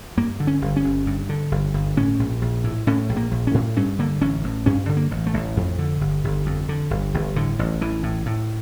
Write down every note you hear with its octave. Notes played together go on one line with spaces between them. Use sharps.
G2 A#3
D3
C#4
G1
C#4
G1
G2
D3
G1
G1
A2 C#4
A#1
A#1
A2
A2 C#4
A#1
A#3
A#1
C#4
A2
G2 C#4
D3 A#3
A1 C#4
A1
G2 C#4
D3
A#3
A1
A3
A1
F2
D3
G1
G1
F2
D3
G1
G1
A2 D3
A1
A1 E3
A2
A2